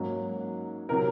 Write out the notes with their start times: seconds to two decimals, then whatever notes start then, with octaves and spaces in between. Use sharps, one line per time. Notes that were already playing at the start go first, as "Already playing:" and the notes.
Already playing: G#2 F#3 A#3 C#4
0.89 C3 F#3 A#4